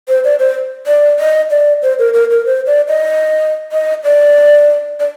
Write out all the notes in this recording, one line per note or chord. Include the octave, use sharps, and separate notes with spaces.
C5
D5
C5
D5
D#5
D5
C5
A#4
A#4
A#4
C5
D5
D#5
D#5
D5
D5